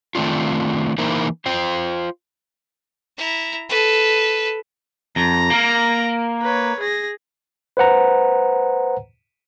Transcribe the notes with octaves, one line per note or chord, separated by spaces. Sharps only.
D#3 A3 C4 D4 F4
E3 A#3 D#4 E4 A#4 C5
F4 C5 G5
E4 A#5
A4 B4
F2 A#5
A#3 A#4
B4 C#5
G#4 A#6
B4 C5 F#5 A#5